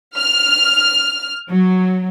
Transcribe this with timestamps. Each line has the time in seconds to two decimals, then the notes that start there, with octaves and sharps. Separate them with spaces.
0.17 F6
1.48 F#3